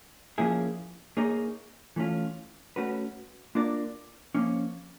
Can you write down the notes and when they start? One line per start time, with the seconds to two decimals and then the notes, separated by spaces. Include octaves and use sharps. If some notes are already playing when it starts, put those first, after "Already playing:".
0.38 F3 A#3 C#4 E4 G#4
1.17 A#3 D#4 G#4 C#5
1.96 E3 A3 C#4 F4
2.76 A3 C#4 F#4 B4
3.55 A#3 D4 F4 A#4 D5
4.35 F3 A#3 C#4